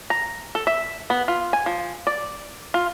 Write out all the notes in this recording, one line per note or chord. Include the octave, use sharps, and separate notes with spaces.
A#5
A4
E5
B3
F4
G#5
F3
D5
F4